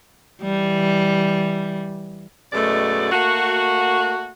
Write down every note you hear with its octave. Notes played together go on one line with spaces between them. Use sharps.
E3 G3
F#2 B2 G#3 A3 D5
A3 A#3 F#4